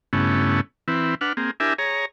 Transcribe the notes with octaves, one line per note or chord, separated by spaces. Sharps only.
G2 C#3 A3 B3 C#4 E4
E3 C4 E4 B4
D4 B4 F#5 F6
A#3 C4 G#4
D4 E4 G4 A#4 E5 G#5
G#4 C#5 A#5